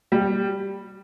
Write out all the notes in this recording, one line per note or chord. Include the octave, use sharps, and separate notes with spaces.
G3